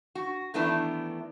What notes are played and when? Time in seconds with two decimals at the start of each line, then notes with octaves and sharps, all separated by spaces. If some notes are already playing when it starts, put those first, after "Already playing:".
0.15 F#4
0.54 D#3 E3 A3 B3 D4 E4